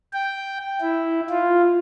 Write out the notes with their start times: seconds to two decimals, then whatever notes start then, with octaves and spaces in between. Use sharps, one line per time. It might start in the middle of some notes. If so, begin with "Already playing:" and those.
0.13 G5
0.81 E4
1.30 F4